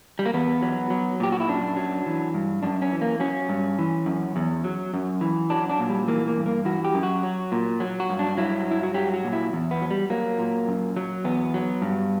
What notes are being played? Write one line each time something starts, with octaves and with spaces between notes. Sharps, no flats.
G3
A#3
E2 B3
F#3
F#3
A#2 G4
F#4
E4
F#2 D4
F#3
E3
G2
F#2 D4
C#4
E3
A#3
F#3 C#4
G2
E3
F#2
E2
F#3
F#2
E3
F#3 D4
D4
A#2
G3
E3 A#3
A#3
G2
A#3
E3 F#4
G4
F#2
F#4
F#3
A#2
F#3
F#4
G2
D4
F#3 E4
G2 E4
F#4
F#3 G4
F#4
A#2
E4
E2
B3
F#3
G3
F#3 A#3
A#2
F#2
F#3
E2 B3
F#3
G2